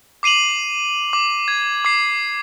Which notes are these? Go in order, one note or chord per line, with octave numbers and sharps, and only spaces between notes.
D6 C7 D#7 F7 F#7
D6
G#6
D6 C7